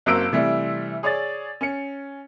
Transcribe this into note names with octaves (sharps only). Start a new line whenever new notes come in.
F#1 F#3 A#3 C4 E6 D7
C3 E3 G3 A3
G#4 C#5 D5 A6
C#4 C#7